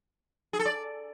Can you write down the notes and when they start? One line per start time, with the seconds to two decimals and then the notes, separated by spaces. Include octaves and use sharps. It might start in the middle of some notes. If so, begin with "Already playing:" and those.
0.53 G#4
0.59 A4
0.66 D5